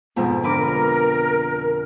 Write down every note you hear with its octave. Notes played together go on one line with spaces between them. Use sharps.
F2 G#2 B2
D3 A#4 B4 D6